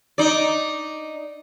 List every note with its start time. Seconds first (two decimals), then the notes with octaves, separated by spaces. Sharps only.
0.18 D#4 D5